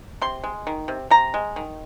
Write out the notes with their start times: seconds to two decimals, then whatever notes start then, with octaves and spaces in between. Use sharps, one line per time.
0.22 C3 C6
0.43 G#3
0.67 D#3
0.88 C3
1.10 C3 A#5
1.34 G#3
1.56 D#3